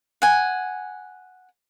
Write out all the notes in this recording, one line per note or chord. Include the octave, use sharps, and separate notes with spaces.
F#5 G#5